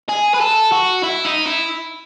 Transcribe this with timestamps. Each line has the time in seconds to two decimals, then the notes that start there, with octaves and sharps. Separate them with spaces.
0.09 G#4
0.34 B4
0.40 A4
0.72 F#4
1.03 E4
1.25 D#4
1.46 E4